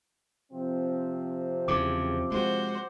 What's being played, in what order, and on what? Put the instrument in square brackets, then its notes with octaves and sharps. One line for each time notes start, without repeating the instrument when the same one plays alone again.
[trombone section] C3 F3 C4
[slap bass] E2 C#3 [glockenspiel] D6
[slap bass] G#3 [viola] F#4 C5